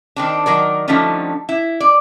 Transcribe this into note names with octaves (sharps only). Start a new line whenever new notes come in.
D#3 C4 D4
D#3 F#3 A#4 D5
D3 F3 G3 A3 C#4 D#4
E4
D5